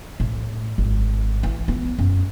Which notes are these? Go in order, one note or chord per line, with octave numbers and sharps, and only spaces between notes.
A2
G#1
E3
B3
F#2